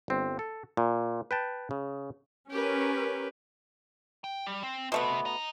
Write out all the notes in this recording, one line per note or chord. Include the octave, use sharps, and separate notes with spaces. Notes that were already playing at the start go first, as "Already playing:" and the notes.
G1 C4
A4
A#2
B4 G5 A5
C#3
C#4 G4 A#4 B4
G5
G3
C4
B2 A3 B3 C5 E5
D#5 A#5